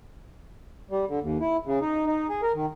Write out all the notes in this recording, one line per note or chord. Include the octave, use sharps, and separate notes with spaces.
G3
D3
D#2
E4
C#3
D#4
D#4
G#4
A#4
D#3